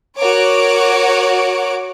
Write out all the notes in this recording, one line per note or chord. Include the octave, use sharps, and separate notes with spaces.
F#4 A#4 C#5 D6